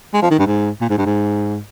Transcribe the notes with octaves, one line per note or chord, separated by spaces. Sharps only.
G#3
F3
D#3
G2
G#2
A#2
G#2
G2
G#2